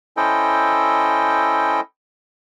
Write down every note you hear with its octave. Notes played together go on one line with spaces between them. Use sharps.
C#4 E4 A4 C5 D#5 G5